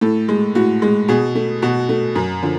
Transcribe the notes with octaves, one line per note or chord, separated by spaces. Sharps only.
A2 A4
G#3
A2 F#4
G#3
B2 G#4
A3
B2 F#4
A3
F#2
D3 F3